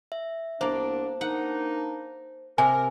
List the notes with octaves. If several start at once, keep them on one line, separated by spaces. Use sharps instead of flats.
E5
C2 A#3 B3 D4 C5
A#3 D4 D#4 F#5
C3 A#4 G#5